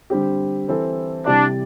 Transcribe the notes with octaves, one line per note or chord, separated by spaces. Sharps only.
D3 G3 C4 G4
E3 C4 E4 A4
C3 G3 D4 E4 G4 D5